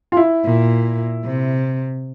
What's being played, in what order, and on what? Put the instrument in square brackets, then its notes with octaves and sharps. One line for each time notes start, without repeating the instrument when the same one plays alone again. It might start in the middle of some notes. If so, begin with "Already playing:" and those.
[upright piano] F4
E4
[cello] A#2
C3